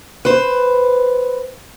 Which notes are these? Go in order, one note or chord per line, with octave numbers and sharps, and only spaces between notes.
B4 C5